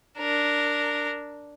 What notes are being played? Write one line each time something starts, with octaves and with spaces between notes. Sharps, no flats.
D4 A#4